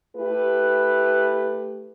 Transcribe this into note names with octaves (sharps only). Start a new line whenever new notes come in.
A3 E4 G4 B4